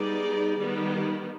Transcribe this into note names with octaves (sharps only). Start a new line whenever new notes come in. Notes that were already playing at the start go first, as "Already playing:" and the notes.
Already playing: G3 B3 D#4 G#4 D5
D#3 G3 B3